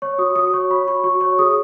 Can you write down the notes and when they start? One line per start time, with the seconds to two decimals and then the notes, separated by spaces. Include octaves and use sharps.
0.02 C#5 C#6
0.18 F#4 D#6
0.35 F#4 D#6
0.53 C#5 C#6
0.70 C#5 B5
0.87 F#4 C#6
1.04 F#4 C#6
1.21 C#5 C#6
1.39 G#4 D#6